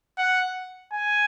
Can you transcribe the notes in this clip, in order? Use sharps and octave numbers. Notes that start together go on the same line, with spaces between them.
F#5
G#5